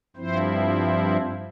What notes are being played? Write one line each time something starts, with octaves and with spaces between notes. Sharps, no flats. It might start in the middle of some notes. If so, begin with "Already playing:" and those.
G2 F3 C4 E4 C5
C5